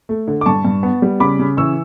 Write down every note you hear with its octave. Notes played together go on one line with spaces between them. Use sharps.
A3
D3
D6
G2 A5 C#6
G2
B3
G3
C#3 B5 D6
C#3
E3 C#6 E6